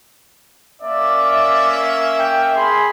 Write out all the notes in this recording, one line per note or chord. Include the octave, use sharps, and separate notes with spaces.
A#3 C#4 D5 E5
G5
G#4 B5 C6